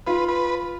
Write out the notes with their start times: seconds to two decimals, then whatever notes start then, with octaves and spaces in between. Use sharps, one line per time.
0.07 F4 B4
0.29 B4